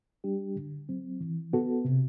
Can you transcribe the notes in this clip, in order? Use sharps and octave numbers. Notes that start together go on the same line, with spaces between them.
G3 D4 G4
D3
F#3 C4
E3
B3 F#4 A4
C3